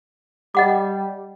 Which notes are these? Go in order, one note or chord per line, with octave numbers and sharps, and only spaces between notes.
G3 D#5 F#5 D6